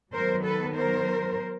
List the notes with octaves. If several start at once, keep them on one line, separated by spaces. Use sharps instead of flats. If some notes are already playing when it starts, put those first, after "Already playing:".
D#3 F#3 B3 A#4 C5
A4 B4
A#4 C5